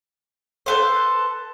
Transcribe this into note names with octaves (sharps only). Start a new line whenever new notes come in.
A4 B4 C5